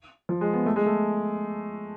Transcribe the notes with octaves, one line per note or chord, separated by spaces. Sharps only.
F3
G#3
B3
A3
G#3
A3